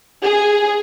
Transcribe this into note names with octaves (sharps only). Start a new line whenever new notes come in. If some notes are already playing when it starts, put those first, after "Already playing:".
G#4